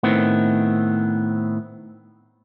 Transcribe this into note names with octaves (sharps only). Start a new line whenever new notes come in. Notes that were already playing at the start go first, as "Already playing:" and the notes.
A2 D#3 B3 C4